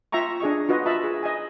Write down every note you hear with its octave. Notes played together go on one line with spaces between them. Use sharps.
F4 E5 G5 A#5 C#6
D4 G#4 D#5 C#6
F4 F#4 B4 D#5
F4 D#5 E5 A5 B5
G#4
D#5 G#5